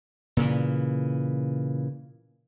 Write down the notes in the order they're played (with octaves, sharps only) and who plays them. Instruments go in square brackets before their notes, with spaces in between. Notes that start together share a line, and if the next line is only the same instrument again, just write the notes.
[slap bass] A#2 C#3 E3